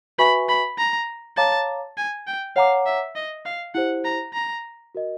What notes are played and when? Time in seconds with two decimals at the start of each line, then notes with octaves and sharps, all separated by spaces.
0.18 F#4 B4 E5 G#5 B5 C#6
0.49 B5
0.78 A#5
1.37 C#5 F5 A5 A#5 D6
1.98 G#5
2.27 G5
2.56 C#5 F5 F#5 A#5 D6
2.86 E5
3.15 D#5
3.46 F5
3.75 E4 G4 C5 F#5
4.05 A#5
4.34 A#5
4.95 F#4 A#4 D#5